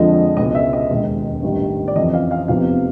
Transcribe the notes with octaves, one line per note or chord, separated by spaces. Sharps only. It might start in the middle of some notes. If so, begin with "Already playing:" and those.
Already playing: F2 D3 F3 G#3 D#5
C#2 B2 G#3 D#5
E5
D#5
E1 D#2 D#3 G#3
A1 G2 D#3 G3
D5
F2 C#3 E3 D#5
F5
F5
F1 E2 C3 F3 F5